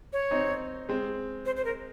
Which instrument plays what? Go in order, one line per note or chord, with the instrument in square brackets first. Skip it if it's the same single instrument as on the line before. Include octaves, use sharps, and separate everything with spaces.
[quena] C#5
[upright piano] C4 D#4
G#3 C4
[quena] C5
C5
A#4